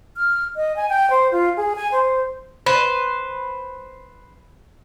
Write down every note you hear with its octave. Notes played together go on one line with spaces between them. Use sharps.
F6
D#5
G#5
G5
C5
F4
G#4
G#5
C5
B4 C5